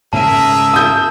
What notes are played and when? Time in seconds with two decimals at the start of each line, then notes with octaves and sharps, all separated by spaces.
0.13 G#2 C#3 C#4 G#4 A#4 E5 A5 D#7
0.74 D#6 G6